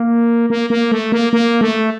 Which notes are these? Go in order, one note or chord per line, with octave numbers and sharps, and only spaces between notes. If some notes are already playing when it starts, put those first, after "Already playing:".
Already playing: A#3
A#3
A#3
A3
A#3
A#3
A3